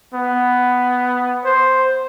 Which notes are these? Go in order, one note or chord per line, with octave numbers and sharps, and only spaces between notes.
B3
C5